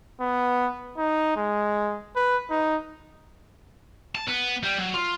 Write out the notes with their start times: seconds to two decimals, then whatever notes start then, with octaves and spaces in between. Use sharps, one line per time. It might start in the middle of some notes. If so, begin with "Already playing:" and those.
0.21 B3
0.98 D#4
1.36 G#3
2.16 B4
2.51 D#4
4.15 A5
4.28 B3
4.63 G3
4.79 F#3
4.94 F4